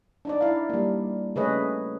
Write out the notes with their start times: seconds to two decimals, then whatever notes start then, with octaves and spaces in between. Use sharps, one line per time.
0.25 D4 D#4 D5
0.41 E4 F5
0.69 G3 A#3
1.36 C#3 A3 G#4 B4 C#5 D#5